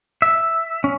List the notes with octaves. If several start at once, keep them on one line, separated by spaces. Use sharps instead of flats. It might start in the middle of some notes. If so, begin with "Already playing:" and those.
E5
C#4